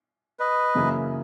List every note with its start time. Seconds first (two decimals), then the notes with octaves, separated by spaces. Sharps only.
0.39 B4 D#5
0.75 F#2 C#3 E3 A#3 E4